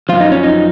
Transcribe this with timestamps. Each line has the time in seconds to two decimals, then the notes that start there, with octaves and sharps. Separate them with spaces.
0.09 F#2 F3 F4
0.20 D#4
0.32 C#4
0.43 D#4